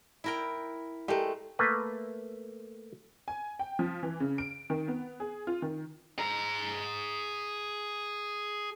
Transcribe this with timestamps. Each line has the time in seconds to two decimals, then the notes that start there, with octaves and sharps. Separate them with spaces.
0.24 E4 A#4 G5
1.08 G#3 A3 G4 A#4
1.59 A3 A#3 B4
3.28 G#5
3.59 G5
3.79 F3
4.03 E3
4.20 C#3
4.38 D7
4.70 D#3
4.88 B3
5.20 G#4
5.47 F4
5.62 D#3
6.19 G#4 A#5